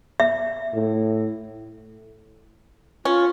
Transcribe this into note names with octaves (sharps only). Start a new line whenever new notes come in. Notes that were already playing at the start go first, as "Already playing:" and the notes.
E5
A2
C#4 F4